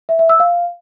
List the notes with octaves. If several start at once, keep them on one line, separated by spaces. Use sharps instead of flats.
E5
E5
E6
F5